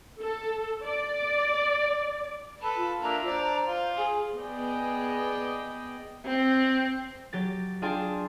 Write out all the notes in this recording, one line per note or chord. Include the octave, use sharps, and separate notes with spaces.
A4
D5
A4 B4 A5
F4
A#3 D4 E5 A#5
D4 C5 D5
F4
G#4 G#5
B3 G#4 D5 D#5 G5
C4
F#3 G4 A6
D4 F4 G#4 G5 A5 C6